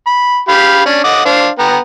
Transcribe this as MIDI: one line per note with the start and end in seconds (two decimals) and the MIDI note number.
0.07 0.39 83
0.49 0.84 67
0.49 0.84 77
0.49 0.84 83
0.86 1.01 61
0.86 1.01 62
0.86 1.01 74
1.04 1.24 75
1.04 1.24 78
1.04 1.24 86
1.25 1.48 62
1.25 1.48 72
1.25 1.48 77
1.59 1.78 59
1.59 1.78 79
1.59 1.78 82